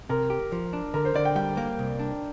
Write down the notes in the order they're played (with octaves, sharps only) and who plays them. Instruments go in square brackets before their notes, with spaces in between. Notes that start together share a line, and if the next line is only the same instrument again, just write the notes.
[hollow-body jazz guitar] C3 [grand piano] A#4
[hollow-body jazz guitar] G4
F3
D4
[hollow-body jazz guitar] D3 [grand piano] A#4
[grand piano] C5
[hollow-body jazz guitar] D3 [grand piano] D5
[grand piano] G5
[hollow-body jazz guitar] G3 [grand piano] G5
[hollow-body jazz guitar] A#3
C2
D4